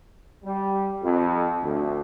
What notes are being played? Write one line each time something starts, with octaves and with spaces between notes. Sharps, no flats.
G3
F2
D2